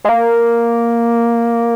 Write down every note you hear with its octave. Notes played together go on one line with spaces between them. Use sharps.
G#3
A#3